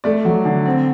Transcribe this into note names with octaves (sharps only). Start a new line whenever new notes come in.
A3 D5
F#3
D3
C4